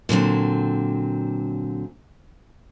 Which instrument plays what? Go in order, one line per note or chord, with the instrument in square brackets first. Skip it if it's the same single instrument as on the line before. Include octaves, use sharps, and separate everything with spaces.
[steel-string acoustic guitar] A#2 D3 F#3 C4